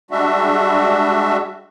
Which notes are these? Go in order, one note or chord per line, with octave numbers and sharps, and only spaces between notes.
G3 G#3 D4 F#4 E5